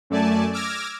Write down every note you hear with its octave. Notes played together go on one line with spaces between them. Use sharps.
F#2 A3 D5 G#5 A5
D6 E6 F6 G#6 A#6